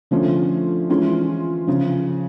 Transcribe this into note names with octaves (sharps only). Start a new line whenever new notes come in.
D3 F3 A3 C#4 F4
E3 G#3 C#4 F4
C#3 F3